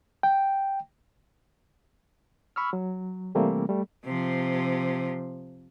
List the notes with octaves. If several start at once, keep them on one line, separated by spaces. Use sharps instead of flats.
G5
B5 C#6 E6 F6
F#3
C3 E3 G3 A3 A#3 C4
G3 A3
C3 F3